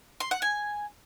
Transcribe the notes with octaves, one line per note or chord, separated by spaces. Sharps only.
C6
F#5
G#5